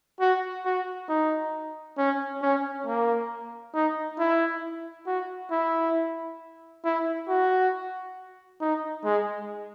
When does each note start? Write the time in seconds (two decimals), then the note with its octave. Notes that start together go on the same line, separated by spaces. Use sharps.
0.20 F#4
0.65 F#4
1.09 D#4
1.98 C#4
2.42 C#4
2.86 A#3
3.74 D#4
4.19 E4
5.06 F#4
5.51 E4
6.84 E4
7.28 F#4
8.61 D#4
9.04 G#3